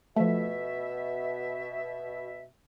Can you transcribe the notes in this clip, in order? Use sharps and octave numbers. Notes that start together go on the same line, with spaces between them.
B2 F3 A3 E5